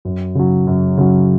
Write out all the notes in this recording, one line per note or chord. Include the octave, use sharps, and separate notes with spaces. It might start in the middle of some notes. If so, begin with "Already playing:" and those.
F#2
C#3 F#3
F#2
C#3 F#3